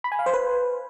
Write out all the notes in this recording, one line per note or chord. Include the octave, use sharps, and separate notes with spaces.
B5
G#5
F5
C5
B4